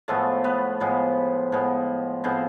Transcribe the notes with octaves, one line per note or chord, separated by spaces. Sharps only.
A2 F3 G#3 A3 B3 A4
B3 B4
A2 F3 G#3 B3
A2 F3 G#3 B3
A2 F3 G#3 B3 C4 C5